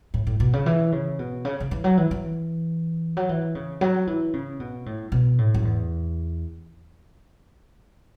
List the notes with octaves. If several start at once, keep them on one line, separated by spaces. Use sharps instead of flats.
A2
A2
B2
C#3
E3
C#3
B2
C#3
C#3
E3
F#3
E3
E3
F#3
E3
C#3
F#3
E3
C#3
B2
A2
B2
A2
F#2
E2